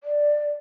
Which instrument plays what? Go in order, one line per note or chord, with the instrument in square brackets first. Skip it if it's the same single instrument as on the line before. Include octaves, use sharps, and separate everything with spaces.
[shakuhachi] D5